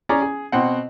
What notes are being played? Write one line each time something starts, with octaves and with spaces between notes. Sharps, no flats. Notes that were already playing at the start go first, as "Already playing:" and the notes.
C#4 G#4 D5 A#5
G#4
B2 C4 F#5